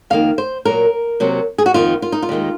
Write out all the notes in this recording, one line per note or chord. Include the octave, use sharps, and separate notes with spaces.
F2 D#3 A#3 F5
C5
A#2 F#3 A#3 A#4
C3 F#3 A#3
G#4
F#4
F2 D#3 A#3 F4
F4
D#4
F4
D#2 D#3 G#3